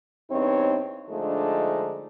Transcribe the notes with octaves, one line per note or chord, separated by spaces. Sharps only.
E2 G2 C4 D#4 C#5 D#5
D3 F3 G#3 A3 D4 D#4